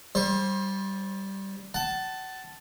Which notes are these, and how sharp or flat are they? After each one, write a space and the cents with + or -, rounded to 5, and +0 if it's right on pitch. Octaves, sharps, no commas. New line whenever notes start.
G3 -10 C5 +30
F#5 +35 A5 +0